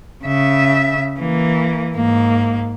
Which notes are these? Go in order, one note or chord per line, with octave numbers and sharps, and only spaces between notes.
C#3 E5
E3 A#3
G#2 A#3